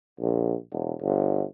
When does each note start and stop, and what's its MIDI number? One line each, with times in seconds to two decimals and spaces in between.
0.20 0.54 34
0.72 0.93 28
1.02 1.43 31